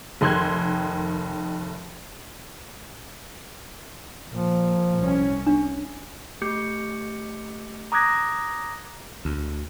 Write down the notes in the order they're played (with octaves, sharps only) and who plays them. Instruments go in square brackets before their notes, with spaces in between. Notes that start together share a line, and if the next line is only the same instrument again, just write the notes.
[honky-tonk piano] F1 D#3 C6 F#6 G#6
[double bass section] A#2 [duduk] F3
[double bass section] C2 C#4
[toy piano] D4
[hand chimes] A3 G4 D6 G6 C#7
A#5 D6 D#6 F#6 G#6 A#6
[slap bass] D2